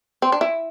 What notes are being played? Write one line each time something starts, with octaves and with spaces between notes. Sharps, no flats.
C4
D4
E4